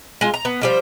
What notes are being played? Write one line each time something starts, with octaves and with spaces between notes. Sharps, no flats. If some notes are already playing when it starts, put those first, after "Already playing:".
G#3 F4
A#5
B3
F3 G3 C5